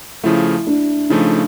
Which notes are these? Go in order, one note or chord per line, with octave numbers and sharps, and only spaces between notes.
C#3 F3 A3 E4
D4
C#3 F3 A3 D#4